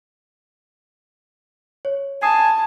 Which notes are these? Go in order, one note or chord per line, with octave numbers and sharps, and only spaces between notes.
C#5
G#5 A5 D#6 C7